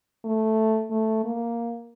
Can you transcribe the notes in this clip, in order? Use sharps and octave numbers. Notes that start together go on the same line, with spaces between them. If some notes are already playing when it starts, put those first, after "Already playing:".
A3
A3
A#3